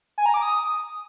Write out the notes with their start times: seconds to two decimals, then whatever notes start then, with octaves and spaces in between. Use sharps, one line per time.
0.18 G#5
0.26 A#5
0.34 D6
0.42 D#6